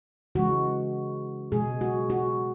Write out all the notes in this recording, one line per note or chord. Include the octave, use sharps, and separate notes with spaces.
C#3 E3 G#3 F#4
B2 G#3 G#4
F#4
F#4